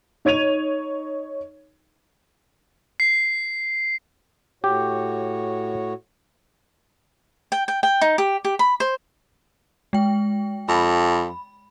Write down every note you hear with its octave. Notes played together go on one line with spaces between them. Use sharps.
D#4 C#5 G#6 D#7 F7
C7
A2 F#4 G4 C#5
G5
G5
G5
D#4
G4
G4
B5
C5
G#3 G5
F2 B5